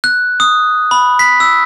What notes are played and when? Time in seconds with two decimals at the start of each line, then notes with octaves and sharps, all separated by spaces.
0.04 F#6
0.40 D#6
0.91 B5
1.19 B6
1.40 E6